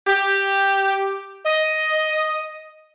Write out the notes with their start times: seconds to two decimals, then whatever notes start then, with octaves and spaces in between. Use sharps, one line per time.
0.07 G4
1.46 D#5